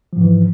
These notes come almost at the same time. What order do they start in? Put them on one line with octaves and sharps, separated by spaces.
F3 G#2 E3